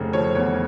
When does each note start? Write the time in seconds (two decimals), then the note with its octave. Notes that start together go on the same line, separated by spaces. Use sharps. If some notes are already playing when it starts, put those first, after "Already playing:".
Already playing: F1 C#3
0.13 F3 C#5
0.35 E2 C#5